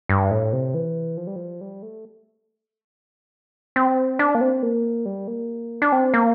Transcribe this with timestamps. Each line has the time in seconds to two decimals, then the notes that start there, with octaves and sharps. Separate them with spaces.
0.09 G2
0.31 A2
0.53 C3
0.74 E3
1.17 F3
1.27 G3
1.36 F3
1.61 G3
1.82 A3
3.76 C4
4.19 D4
4.35 A#3
4.41 C4
4.63 A#3
5.05 G3
5.28 A#3
5.82 D4
5.92 C4
6.14 A#3